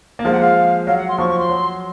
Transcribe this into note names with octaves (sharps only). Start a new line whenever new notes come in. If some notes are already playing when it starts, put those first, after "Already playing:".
A#3
F3 G#3 F5
F#5
F5
F#3 F5
F#5
C6
F3 C#6
C#6
C6
F#3